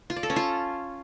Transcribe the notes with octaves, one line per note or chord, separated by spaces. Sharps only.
F4
D5
A4
C#4
F4